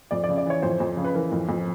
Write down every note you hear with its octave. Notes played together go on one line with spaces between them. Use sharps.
F2 D5
C#3 D5
D5
E3 C#5
F2 C5
F2
C#3
B4
E3 A#4
F2
F2